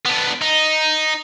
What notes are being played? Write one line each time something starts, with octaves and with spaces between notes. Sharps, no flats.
B3 D4
D#4